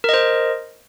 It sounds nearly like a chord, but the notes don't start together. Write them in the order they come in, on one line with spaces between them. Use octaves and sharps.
A#4 D#5 C5